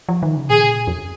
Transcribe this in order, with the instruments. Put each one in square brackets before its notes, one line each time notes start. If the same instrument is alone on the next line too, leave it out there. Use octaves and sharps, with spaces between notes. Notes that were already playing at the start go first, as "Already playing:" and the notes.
[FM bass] F3
D#3
C#3
[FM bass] A#2 [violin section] G#4
[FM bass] F2